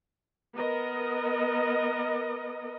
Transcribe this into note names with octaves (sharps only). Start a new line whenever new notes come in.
B3 A#4 D#5